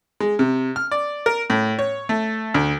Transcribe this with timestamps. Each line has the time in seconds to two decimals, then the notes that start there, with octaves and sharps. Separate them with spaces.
0.20 G#3
0.39 C3
0.76 F6
0.91 D5
1.26 A#4
1.50 A2
1.79 C#5
2.09 A3
2.54 D2